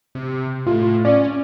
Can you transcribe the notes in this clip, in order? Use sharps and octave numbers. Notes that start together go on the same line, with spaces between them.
C3
A2 F4
C#4 D5